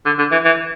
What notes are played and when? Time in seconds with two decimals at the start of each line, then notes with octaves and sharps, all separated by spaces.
0.06 D3
0.19 D3
0.32 E3
0.45 E3